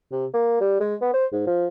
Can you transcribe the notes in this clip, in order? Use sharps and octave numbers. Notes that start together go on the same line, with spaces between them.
C3
A#3
G3
G#3
B3
C5
G#2
F3